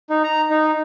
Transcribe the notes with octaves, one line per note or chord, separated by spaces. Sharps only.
D#4
A#5
D#4